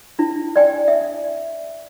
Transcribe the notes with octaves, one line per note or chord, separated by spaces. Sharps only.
D4 E4
D5 G5 G#5
E5